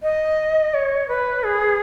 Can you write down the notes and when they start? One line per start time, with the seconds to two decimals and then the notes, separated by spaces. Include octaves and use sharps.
0.03 D#5
0.74 C#5
1.08 B4
1.44 G#4